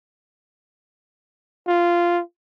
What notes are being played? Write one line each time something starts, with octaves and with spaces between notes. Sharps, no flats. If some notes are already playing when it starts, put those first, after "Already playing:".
F4